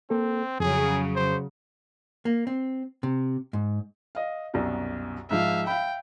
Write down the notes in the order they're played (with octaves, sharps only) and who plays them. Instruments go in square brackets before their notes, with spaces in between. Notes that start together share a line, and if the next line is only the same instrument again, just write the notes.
[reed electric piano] A#3 A4 [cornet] C4
[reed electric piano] F2 [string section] C#3 F#3 [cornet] G#4
[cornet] C5
[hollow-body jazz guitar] A#3
C4
C3
G#2
[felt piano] D#5 F5
C2 F#2 B2
[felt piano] G#2 F3 [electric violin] E5 F5
[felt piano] F5 B5 [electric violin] G5